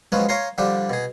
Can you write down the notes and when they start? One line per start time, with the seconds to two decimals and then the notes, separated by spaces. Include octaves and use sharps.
0.12 F3 F#3 G#3 B3 C#4
0.29 C#5 F5 G#5 A#5 C6
0.58 D3 F3 G3 D4 G4
0.90 B2 G#4